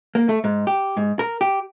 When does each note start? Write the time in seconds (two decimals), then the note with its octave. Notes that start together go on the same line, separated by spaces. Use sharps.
0.15 A#3
0.29 A3
0.44 G#2
0.67 G4
0.97 G#2
1.19 A#4
1.41 G4